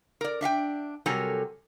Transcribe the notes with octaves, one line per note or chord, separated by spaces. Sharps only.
A#4 D5
D4 E5 F5 G5
C3 F#3 G3 A4 A#4 G#5